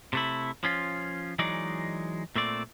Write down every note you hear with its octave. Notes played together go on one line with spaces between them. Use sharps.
C3 A3 E4
F3 C#4 F4
E3 F#3 G#3 D#4 D5
A#2 A3 C4 D5